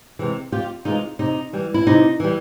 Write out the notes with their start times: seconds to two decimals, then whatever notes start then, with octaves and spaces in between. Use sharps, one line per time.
0.19 C3 E3 G#3
0.52 F2 F4 G4
0.85 C3 E3 G#3 D#4 F4
1.19 C3 D#4
1.53 E3 G3
1.74 E4
1.87 C3 D#4
2.20 E3 G3